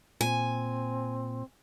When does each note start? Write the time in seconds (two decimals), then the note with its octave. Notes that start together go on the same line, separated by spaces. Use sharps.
0.21 A#2 C4 G#5